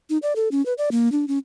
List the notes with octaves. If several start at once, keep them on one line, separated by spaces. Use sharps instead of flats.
D#4
D5
A4
C#4
B4
D5
A#3
D4
C#4